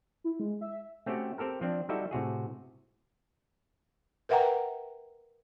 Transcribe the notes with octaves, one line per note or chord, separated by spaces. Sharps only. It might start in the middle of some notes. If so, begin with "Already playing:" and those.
E4
G#3
E5
A3 C4 C#4 F#4 G4
C4 G4 A4 A#4
F3 C4 D4
G3 D#4 E4 F#4 A4 E5
A2 C3 F#4 G#4
A#4 B4 E5 F#5 G5 A#5